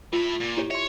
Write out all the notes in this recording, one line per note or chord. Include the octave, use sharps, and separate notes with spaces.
A2 F4 B5
A#2
E4 G4 C#5
C#5 E5 C6